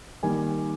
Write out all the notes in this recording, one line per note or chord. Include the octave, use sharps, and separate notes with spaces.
D#3 G3 A#3 G#5